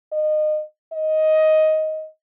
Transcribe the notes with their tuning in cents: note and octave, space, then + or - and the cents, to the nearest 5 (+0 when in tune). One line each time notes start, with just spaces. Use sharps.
D#5 -25
D#5 +10